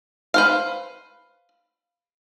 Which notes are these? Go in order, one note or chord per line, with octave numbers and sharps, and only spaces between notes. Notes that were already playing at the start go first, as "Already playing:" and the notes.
B4 C5 F5